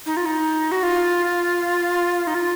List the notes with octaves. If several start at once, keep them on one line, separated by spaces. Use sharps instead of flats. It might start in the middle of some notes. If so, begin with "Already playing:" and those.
D#4
F4
D#4
F#4
F4
D#4
F4